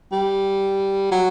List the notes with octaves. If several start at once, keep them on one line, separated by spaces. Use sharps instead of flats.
G3
F#3